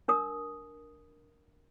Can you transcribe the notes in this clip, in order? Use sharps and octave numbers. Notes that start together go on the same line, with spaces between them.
D4 A#4 D#6